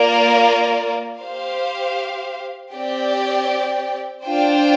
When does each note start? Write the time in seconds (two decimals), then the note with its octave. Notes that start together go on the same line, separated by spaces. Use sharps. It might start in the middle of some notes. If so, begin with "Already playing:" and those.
Already playing: A#3 F4 A#4 D5
1.21 G4 C5 F5
2.74 C4 G4 D5 G5
4.27 D4 F4 C5 G5